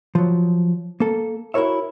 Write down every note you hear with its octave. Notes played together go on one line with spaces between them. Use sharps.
F3 F#3
A#3 A4
E4 F#4 A#4 C#5 E5